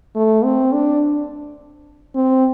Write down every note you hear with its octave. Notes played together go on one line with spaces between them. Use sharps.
A3
C4
D4
C4